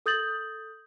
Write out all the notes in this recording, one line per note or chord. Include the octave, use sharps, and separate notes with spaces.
A4 D#6 G6 A6 F#7